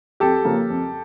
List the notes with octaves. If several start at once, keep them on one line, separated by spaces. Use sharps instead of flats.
F2 G4 A4
C#3 F3 A#3
F2